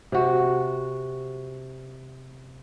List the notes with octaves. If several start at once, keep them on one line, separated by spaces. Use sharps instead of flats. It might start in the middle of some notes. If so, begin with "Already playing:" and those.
C3 F#4